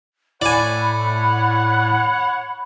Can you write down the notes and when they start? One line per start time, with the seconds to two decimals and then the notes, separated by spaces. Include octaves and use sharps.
0.42 A2 C#5 D5 F#5 G#5 B5